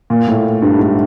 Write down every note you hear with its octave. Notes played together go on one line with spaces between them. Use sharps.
A#2
A2
G2
G#2